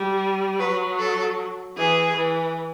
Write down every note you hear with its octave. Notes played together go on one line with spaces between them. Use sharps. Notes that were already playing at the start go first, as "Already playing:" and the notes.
Already playing: G3
F#3 B4
A4
E3 G#4
E3